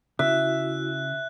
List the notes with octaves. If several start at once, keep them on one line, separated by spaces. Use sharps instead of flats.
C#3 E4 F#4 E5 F#6